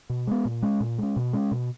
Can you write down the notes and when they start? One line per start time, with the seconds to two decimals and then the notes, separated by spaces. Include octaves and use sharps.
0.10 B2
0.27 G#3 B3
0.45 A#2
0.62 G#3 C#4
0.80 A#2
0.98 G#3 C#4
1.16 B2
1.33 G#3 C#4
1.51 B2